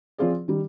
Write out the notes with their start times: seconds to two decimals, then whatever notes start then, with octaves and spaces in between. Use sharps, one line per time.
0.18 F3 C4 F4 G#4 D5
0.48 D#3 G3